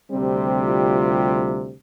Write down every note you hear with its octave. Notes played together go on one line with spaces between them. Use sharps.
D2 C3 G3 C4
F4